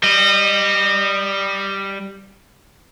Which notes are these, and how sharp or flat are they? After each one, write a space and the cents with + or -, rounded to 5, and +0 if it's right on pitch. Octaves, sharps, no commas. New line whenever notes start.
G3 +0 D#5 -25